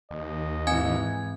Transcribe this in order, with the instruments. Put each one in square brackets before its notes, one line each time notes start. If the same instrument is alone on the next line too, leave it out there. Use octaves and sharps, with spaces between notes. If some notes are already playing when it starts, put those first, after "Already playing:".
[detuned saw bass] D#2 [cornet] D#5
[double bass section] G#2 E3 [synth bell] C4 G#5 G#6